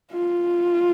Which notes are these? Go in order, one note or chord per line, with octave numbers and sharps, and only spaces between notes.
F4